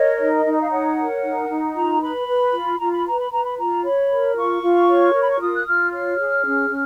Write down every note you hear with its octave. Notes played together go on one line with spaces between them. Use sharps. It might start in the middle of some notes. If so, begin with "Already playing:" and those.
Already playing: A#4 C#5 D#5
D#4
D#4
D#5
F5
C#5 F#5
A#4
D#4
D#4
F4 A#5
B4 B5
B4
F4
F4 A#5
B5
B4 A#5
B5
B4 A#5
B5
F4 A#5
C#5 B5
A#4
F4 C#6
F4
C#5
A#4
B5
C#6
F4 D#6
F#6
F4 F6
C#5 F6
G#4
C#4
C#4